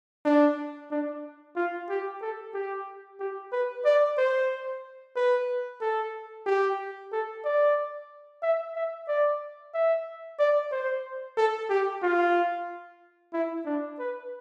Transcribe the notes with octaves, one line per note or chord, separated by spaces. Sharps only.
D4
D4
F4
G4
A4
G4
G4
B4
D5
C5
B4
A4
G4
A4
D5
E5
E5
D5
E5
D5
C5
A4
G4
F4
E4
D4
B4